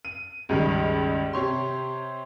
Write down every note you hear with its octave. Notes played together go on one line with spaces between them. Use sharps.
D#7
C#2 G2 D#3
C3 G4 C#5 C6